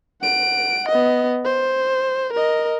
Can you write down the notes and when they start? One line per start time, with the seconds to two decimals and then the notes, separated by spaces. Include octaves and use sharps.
0.22 F#5 D7
0.88 B3 D#5
1.45 C5
2.33 A#4 D#5